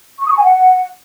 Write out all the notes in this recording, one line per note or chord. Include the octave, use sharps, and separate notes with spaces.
C#6
D#6
C#6
G#5
F#5